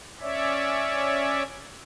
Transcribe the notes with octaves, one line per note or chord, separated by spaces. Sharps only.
C#4 C#5 D5 E5